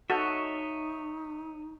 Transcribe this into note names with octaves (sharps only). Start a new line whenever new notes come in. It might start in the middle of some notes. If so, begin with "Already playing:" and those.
D#4 F#4 A4 C#5 D#5 E5